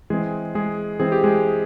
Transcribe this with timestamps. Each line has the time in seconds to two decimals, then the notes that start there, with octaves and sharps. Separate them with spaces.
0.10 E3 G#3 C4 G#4
0.55 G#3 G#4
1.00 E3 G#3 C4 G#4
1.12 G4
1.24 G#3 G#4